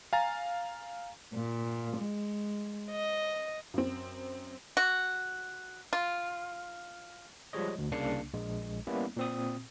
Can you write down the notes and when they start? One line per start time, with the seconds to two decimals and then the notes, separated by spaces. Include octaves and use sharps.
0.13 F5 G#5 A#5 A6
1.33 A#2
1.96 G#3
2.91 D#5
3.74 F#2 C4
4.77 F#4
5.93 F4
7.53 F3 G3 G#3 C#5 D#5
7.78 D2
7.92 C2 C#3 A#3 D4 C7 C#7
8.34 A#1 G#3
8.87 G3 A#3 B3 C#4 E4
9.17 A#2 C4 D#6